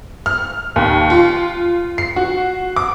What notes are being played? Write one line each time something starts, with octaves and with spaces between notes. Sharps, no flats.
F6
D#2
F4
C7
F#4
D6